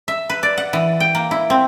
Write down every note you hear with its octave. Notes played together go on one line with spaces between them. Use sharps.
E5
B4
D5
F#5
E3
G5
A#3
E4
C4